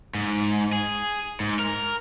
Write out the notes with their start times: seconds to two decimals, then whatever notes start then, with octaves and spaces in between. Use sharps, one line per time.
0.15 G#2
0.73 G#4
1.40 G#2
1.60 A#4